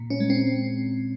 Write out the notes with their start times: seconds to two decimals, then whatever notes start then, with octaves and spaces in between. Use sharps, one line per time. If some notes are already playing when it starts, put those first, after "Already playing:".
Already playing: A#2
0.10 C#4
0.20 G#3
0.30 C4